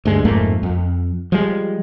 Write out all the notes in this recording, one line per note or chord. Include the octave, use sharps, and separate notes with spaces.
D2 G2 G#3
F2 G#2 A3 A#3
F2
F3 G3 G#3